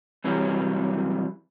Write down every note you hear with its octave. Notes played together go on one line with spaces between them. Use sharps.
F#2 C3 E3 F#3 G3